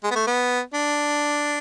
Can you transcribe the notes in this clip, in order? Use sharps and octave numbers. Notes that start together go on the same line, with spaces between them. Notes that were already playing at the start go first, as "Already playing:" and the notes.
G#3
B3
A3
B3
D4